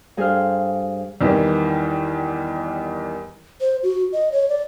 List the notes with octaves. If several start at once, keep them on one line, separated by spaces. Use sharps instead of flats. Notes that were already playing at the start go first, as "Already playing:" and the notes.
G2 G#4 A4 C5 F5 F6
E2 D#3 E3 G3
C5
F#4
D#5
C#5
D5